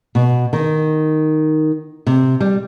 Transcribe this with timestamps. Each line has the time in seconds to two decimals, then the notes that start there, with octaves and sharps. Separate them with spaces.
0.15 B2
0.53 D#3
2.07 C3
2.40 G3